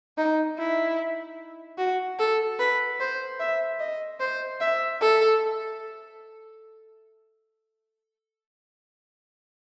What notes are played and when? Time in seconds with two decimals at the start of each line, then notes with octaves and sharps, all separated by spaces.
0.18 D#4
0.58 E4
1.78 F#4
2.19 A4
2.59 B4
3.00 C5
3.39 E5
3.80 D#5
4.20 C5
4.60 E5
5.01 A4